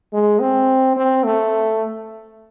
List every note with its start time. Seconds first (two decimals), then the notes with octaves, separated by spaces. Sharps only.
0.13 G#3
0.40 C4
0.97 C4
1.24 A3